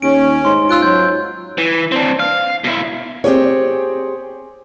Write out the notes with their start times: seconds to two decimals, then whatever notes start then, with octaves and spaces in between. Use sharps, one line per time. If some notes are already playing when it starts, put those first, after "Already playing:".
0.02 D#2 C#4 D7
0.45 G#2 C6
0.69 F4 E6 F#6 D7
0.82 F#3 G6
1.58 E3
1.92 C4 D4
2.20 F5
2.64 B2 E4
3.24 C4 G4 G#4 C#5